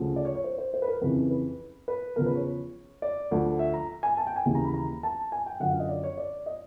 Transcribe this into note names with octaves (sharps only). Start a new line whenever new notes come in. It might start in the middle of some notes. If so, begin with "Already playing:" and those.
Already playing: D2 C#3 F3
D5
C#5
C#5
C5
C5
C5
B4
A#4
F2 C#3 E3 B4
B4
B4
E2 C#3 F3 A#4
B4
C#5
D5
D2 D3 F3
E5
A#5
G#5
A5
G5
G#5
D#2 C#3 E3
A#5
B5
A#5
A5
G#5
G5
F#2 D3 F3 F#5
F5
D#5
D5
C#5
D5
D#5